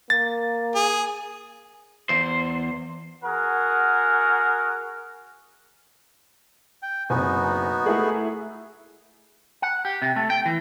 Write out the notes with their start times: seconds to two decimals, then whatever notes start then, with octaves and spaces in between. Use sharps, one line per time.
0.10 A#3 A6
0.75 G#4
2.09 E2 C5
3.24 F#4 G#4 A#4 F#5
6.82 G5
7.10 F#1 B3 C4 D#4 F#4 G#5
7.86 A3 E4 G#4
9.62 F#5
9.85 G4
10.02 C3
10.16 A3
10.30 G5
10.46 E3